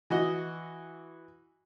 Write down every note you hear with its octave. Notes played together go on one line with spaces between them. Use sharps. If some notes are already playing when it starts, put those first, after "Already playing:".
E3 F#4 D#5